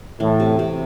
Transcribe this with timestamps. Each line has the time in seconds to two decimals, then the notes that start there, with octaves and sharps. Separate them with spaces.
0.20 A2 E3
0.40 C3
0.59 C3